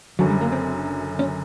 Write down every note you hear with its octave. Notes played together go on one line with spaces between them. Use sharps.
F#1 F#2 D3 F#3
G3
A#3
C4
C#4